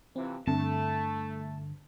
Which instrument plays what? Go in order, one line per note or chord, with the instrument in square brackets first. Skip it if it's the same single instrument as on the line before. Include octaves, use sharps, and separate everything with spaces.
[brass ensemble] C3 E3 F3 [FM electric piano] C4
[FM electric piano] G2 D3 [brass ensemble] A3 [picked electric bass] C4 [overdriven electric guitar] A5